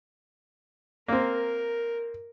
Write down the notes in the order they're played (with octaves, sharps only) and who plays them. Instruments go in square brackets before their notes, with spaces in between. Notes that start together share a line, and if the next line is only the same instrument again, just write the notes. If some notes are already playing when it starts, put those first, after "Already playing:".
[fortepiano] A#3 C4 [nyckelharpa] A#4